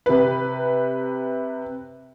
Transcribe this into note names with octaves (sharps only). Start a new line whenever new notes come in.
C3 B4